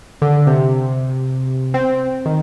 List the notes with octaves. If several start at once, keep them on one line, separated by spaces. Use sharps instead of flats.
D3
C3
C4
D#3